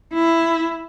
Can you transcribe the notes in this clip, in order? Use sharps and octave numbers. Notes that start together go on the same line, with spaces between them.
E4